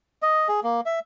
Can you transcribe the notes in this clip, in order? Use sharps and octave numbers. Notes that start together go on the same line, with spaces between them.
D#5
G#4
A#3
E5